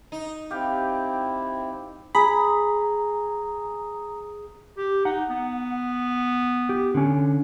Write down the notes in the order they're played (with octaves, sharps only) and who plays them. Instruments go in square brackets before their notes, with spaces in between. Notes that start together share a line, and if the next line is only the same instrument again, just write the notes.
[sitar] D#4
[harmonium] C4 E4 [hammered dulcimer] G4 F5 G5
[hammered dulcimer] G#4 [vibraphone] A#5 [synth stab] B5
[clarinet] G4
[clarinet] D#4 [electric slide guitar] F#5
[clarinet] B3
[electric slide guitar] G4
D3 C#4